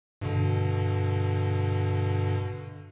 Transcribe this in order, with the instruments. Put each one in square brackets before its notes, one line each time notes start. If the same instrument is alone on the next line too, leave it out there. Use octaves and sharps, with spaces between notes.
[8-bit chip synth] G2 B2 D3